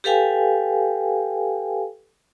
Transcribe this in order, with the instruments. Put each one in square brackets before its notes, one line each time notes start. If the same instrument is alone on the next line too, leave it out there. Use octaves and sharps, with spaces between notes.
[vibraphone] G4 A4 B4 F5 G5 G#5